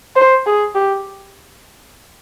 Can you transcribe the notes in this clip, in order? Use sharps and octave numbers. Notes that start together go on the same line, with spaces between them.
C5
G#4
G4